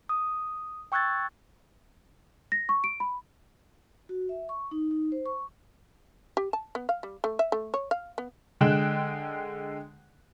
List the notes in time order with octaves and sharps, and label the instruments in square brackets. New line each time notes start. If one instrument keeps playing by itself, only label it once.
[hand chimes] D#6
G5 C#6 E6 F#6 G#6 A6
[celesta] A#6
C#6
D7
B5
[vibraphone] F#4
E5
C#6
D#4
D#4
C5
C#6
[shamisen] G4
A5
B3
F5
G3
A3
E5
A3
C#5
F5
B3
[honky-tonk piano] D3 G#3 G5 F#6 E7